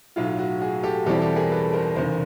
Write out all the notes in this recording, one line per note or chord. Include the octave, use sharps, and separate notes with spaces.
B1 A2 F#3 A3 F4
F#4
F#4 G#4
G4 A4
E2 B2 G3 C4 E4 G4 A4
G4 A4
G#4 A#4
A4 B4
A#4 C5
F1 E2 C#3 A#4 C5